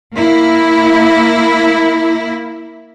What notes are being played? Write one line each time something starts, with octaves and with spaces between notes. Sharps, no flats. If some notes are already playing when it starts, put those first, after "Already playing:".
A#3 E4